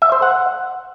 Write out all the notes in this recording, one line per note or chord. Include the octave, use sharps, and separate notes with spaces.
E5
C5
F#5